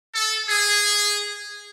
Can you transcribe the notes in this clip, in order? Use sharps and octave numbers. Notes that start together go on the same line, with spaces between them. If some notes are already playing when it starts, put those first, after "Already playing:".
A4
G#4